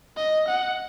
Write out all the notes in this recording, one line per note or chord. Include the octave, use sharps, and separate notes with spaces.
D#5
F#5